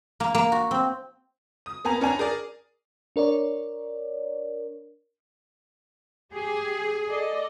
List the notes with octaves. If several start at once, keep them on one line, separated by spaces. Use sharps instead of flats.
A#3
A#3
F#4
C4
D#6
A#3 B3 G#5 A#5
C#4 D4 G#5 A#5
G#4 A#4 D5
D4 A#4 C#5 D5
G4 G#4
A4 D5 D#5